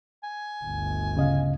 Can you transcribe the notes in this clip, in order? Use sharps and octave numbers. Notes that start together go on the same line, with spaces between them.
G#5
G1 D2
C#3 D#5 F5